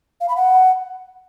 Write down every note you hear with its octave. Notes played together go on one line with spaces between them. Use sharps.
F5
B5
F#5